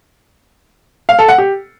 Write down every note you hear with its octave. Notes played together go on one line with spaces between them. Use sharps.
F5
A4
F#5
G4